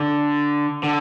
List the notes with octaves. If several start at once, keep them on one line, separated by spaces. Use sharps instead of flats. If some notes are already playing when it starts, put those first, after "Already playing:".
Already playing: D3
D3